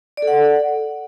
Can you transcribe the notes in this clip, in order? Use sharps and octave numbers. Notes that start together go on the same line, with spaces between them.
D5
A4
F#5